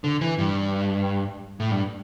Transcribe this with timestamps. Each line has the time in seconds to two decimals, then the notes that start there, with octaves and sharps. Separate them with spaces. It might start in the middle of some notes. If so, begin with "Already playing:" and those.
0.04 D3
0.21 E3
0.38 G2
1.60 A2
1.71 G2